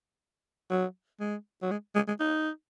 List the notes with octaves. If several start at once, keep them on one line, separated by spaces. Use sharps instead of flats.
F#3
G#3
F#3
G#3
G#3
G#3
D#4